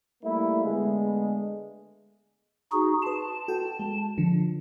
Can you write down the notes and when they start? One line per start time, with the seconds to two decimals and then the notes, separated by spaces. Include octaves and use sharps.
0.23 G3 A3 A#3 E4
0.63 D3 G#3 A3 B3
2.72 D#4 F#4 G#4
3.02 B4 A5 C6
3.48 F#4 A4 G5
3.79 G#3
4.18 D3 F3